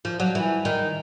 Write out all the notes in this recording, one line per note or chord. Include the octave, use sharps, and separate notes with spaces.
F3
F#3
E3
D#3